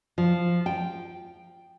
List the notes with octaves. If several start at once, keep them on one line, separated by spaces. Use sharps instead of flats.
F3
G5